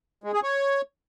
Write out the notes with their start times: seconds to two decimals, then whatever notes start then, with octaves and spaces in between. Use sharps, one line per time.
0.24 G#3
0.33 G#4
0.43 C#5